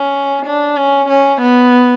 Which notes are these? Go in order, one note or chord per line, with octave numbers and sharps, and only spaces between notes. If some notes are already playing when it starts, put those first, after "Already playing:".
Already playing: C#4
D4
C#4
C#4
B3